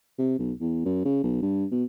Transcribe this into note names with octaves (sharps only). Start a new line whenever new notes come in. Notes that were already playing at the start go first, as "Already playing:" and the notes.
C3
B1
E2
F#2
C#3
B1
G2
B2